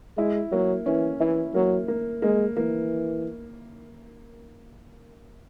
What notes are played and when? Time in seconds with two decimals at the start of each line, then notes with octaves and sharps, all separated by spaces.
0.18 G#3 E4
0.52 F#3 A#3
0.86 E3 C#4
1.20 E3 E4
1.54 F#3 A#3
1.88 A#3
2.22 G#3 A#3
2.56 E3 A#3